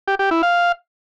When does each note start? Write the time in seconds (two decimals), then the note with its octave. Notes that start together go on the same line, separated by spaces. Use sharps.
0.08 G4
0.19 G4
0.31 E4
0.43 F5